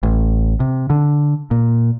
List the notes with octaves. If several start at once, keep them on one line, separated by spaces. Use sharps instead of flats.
A1
C3
D3
A#2